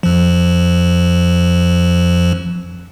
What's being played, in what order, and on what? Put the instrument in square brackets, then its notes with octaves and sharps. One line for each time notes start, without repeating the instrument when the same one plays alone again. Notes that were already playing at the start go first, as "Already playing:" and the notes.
[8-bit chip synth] F2 F3